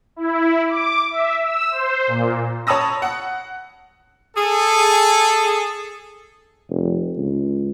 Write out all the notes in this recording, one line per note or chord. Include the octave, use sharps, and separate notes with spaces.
E4
D6
E5
E6
C5
A#2
C#5 A5 B5 D#6 E6 A#6
F#5
G#4 A4
F1
C#2